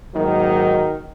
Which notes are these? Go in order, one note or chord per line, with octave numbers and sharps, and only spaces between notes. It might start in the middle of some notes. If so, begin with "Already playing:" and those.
G#2 D#3 F#3 A#3 D#4